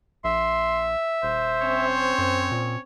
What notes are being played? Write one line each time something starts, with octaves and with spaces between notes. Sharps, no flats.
A#1 E5 C6
D#1 C5
C4 C#4 C#5
F#2
A#2